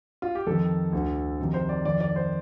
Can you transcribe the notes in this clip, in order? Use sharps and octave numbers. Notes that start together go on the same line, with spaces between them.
F4
G4
F2 D#3 A4
D2 D3
F2 C3 D#3
C5
D5
F2 D#3 D5
D5
C5